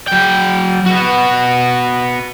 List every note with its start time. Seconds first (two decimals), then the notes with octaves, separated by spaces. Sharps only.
0.07 F#3 G5
0.86 B3 F#4